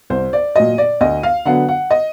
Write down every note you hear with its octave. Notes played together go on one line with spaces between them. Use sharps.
C2 C5
D5
A#2 F#3 D#5
D5
D2 D#5
F5
D3 F#3 B3 F#5
F#5
D#5